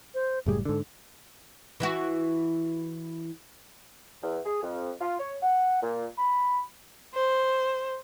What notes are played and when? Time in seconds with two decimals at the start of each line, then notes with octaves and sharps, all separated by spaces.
0.14 C5
0.46 F#1 A2 G3 G#4
0.65 G#2 D3 A4
1.80 E3 E4 F#4
4.23 E2
4.45 G#4
4.63 F2
5.01 F4
5.19 C#5
5.42 F#5
5.82 A#2
6.18 B5
7.14 C5